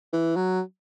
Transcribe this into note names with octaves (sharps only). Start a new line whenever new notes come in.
E3
F#3